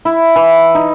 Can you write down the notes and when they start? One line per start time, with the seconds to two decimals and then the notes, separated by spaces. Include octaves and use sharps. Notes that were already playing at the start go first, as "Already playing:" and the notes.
0.05 E4
0.36 E3
0.75 D#4